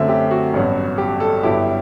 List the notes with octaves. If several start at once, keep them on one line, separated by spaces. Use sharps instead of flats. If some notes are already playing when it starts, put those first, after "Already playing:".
Already playing: F#2 D3 F#3 A3 C4 E5
G4
F#4
A1 G2 F#3 B3
G4
A4
G1 G2 F#3 B3 E4 G4